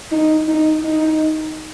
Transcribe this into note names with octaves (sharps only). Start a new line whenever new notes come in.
D#4
D#4
D#4